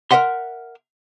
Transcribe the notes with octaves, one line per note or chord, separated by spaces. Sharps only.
A#4 B4 E5 F#5 C6